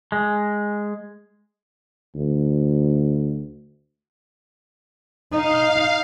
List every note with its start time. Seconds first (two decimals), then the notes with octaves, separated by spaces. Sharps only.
0.12 G#3
2.15 D2
5.32 D#4 F5